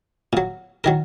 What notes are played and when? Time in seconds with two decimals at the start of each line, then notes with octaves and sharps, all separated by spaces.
0.33 A#2 F#3
0.84 D#3 F#3 A#4